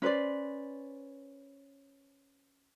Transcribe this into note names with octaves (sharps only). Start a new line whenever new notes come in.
C#4 B4 C5 D5